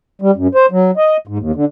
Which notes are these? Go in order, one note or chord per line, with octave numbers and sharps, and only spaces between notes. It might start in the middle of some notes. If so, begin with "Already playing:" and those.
G3
F#2
C5
F#3
D#5
G#2
D#2
D3